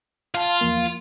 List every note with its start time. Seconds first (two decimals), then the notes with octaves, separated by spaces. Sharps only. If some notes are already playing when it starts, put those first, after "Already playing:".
0.34 F4 F5 A5
0.61 E2 F3 A#3